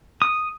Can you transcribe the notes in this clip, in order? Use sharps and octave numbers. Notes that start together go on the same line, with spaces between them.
D#6